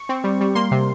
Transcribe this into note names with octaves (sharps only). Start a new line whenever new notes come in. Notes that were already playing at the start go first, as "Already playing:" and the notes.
Already playing: C#6
C4
G3
G3
A#3 C6
C3